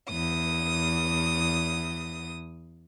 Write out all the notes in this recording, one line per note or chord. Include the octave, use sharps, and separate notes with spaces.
E2 D#6